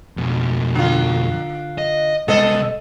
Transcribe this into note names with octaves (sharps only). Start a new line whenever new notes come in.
F2 B2
D3 F4
D#5
C2 G#3 B3 A4 D#5